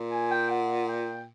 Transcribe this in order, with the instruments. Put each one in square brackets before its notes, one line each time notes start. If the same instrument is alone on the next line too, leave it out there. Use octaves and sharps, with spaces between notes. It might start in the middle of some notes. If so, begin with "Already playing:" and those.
Already playing: [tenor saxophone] A#2
[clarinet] G#5
G5
F#5
G5